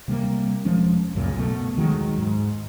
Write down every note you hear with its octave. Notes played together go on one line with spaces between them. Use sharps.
C3 G3 A3 A#3
E1 F3 G#3 C#4
C#2 F#2 A#2 C#3
B1 B2 A3
D#2 D#3 F#3 G#3
G#2